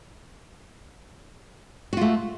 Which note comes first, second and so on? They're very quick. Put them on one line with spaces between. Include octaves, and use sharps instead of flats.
F#4 F4 A3